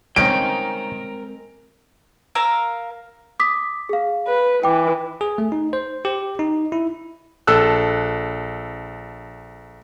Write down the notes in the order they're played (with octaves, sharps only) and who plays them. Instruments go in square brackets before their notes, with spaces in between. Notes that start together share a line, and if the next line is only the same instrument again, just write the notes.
[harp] G#3 C4 [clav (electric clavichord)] A#3 C#4 D#4 [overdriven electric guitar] A#4 G5 [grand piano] D7
[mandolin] A#4 F5 E6
[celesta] D6 D#6 B6
G#4 F5
[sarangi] B4
[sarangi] E3 [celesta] G5 D6
[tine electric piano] G#4
A3
D#4
C5
G4
D#4
E4
[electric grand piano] A#1 A4 E6 F#6